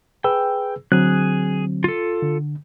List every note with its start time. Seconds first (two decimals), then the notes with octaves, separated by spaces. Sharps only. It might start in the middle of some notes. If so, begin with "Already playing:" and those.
0.24 G#4 B4 G5 E6
0.92 D3 F#3 C4 G#4 F#6
1.84 F4 A4
2.22 D3